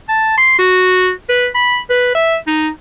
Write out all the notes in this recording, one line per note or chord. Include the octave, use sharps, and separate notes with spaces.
A5
C6
F#4
B4
B5
B4
E5
D#4